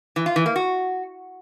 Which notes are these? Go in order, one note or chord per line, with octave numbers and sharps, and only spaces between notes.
E3
F4
E3
A#3
F#4